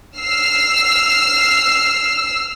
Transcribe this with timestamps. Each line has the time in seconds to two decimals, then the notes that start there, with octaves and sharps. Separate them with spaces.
0.17 E6 F6 C7